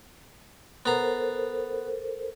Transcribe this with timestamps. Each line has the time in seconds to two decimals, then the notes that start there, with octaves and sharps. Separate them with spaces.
0.86 B3 A4 A#4 C5 A#5